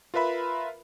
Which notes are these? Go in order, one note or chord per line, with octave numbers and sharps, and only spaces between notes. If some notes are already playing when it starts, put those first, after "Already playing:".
F4 A#4 B4 E5 B5